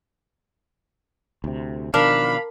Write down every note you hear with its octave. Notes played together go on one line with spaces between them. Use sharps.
D2 C3
B2 D#3 F3 D4 A#4 F5 B5